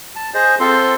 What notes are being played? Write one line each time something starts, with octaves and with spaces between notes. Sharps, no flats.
A5
G#4 C5 D#5
C4 F4 A4 C6